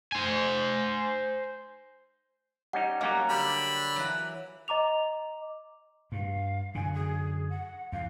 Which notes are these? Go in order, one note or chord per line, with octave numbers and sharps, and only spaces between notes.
C5 G#5
G3 C#4 D#4 F#5
F#3 G3 A#3 C#4 F5 D6
D3 G3 B5
E3 F#3
D#5 A#5 D6 F7
G2 F5
F#2 D3 G#5
G#4
F#5
E2 F5